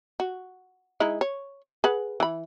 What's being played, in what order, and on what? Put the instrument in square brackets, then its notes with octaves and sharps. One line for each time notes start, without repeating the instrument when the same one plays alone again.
[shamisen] F#4
G#3 D#4 E4
C#5
G#4 B4 F#5
E3 B5